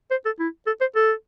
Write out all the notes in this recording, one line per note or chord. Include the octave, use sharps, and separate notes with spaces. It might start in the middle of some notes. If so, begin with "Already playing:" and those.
C5
A4
E4
A4
C5
A4